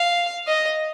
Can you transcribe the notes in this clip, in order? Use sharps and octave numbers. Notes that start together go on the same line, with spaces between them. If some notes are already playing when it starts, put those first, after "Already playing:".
Already playing: F5
D#5